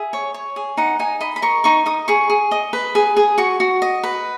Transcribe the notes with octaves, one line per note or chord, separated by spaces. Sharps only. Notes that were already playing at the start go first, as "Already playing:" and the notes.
Already playing: G#4 E5
C#5
C#5
G#4
D#4 F#5
D#4 G#5
D#5 B5
B5
A#4 C#6
D#4 C#6
D#4 D#6
G#4 C#6
G#4
D#5
B4
G#4
G#4
F#4 C#6
F#4
D#5
B4